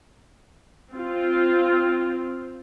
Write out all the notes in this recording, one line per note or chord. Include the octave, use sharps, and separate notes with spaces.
C4 F4